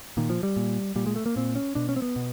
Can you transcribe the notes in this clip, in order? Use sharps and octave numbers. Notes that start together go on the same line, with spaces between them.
A#2 D#3
F3
G3
A#2
A#2 G3
G#3
A3
A#3
A#2 C4
C#4
B2 D4
C#4
C4
B3
B2